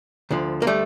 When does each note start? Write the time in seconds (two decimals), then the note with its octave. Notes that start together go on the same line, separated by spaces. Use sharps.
0.31 D2 D3 F3
0.62 A#3
0.67 G3 A3